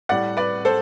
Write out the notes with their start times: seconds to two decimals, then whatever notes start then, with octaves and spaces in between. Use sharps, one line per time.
0.09 A2 G3 D5 F#5
0.37 B4 D5
0.65 A4 C5